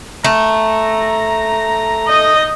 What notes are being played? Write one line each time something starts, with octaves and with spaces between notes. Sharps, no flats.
A3 A#5
D#4 D#5